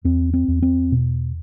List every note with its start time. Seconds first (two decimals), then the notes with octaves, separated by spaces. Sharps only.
0.04 E2 C4
0.34 C4
0.48 E2
0.62 C4
0.92 B2